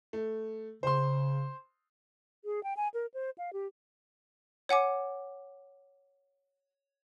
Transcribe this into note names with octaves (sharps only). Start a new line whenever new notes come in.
A3
C#3 C5 C6
G#4
G5
G#5
A#4
C5
F5
G4
C#5 F#5 G#5 D6